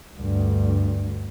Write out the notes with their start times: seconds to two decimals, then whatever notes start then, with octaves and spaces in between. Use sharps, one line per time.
0.17 D2 G2